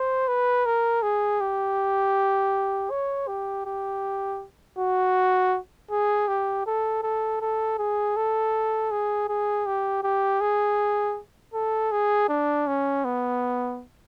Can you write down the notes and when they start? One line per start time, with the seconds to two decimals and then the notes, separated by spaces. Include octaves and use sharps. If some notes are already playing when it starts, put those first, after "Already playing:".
Already playing: C5
0.28 B4
0.66 A#4
1.02 G#4
1.41 G4
2.91 C#5
3.27 G4
3.66 G4
4.79 F#4
5.91 G#4
6.28 G4
6.66 A4
7.03 A4
7.42 A4
7.78 G#4
8.16 A4
8.91 G#4
9.29 G#4
9.66 G4
10.03 G4
10.41 G#4
11.54 A4
11.91 G#4
12.29 D4
12.67 C#4
13.05 B3